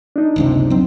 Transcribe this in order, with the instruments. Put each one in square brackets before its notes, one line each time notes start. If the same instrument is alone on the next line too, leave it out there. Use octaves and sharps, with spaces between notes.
[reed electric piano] D4 D#4
[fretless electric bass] F#1 C#2 C3
F#3 C4